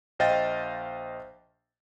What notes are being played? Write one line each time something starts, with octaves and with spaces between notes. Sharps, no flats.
A#1 C5 D#5 F5 G5 A6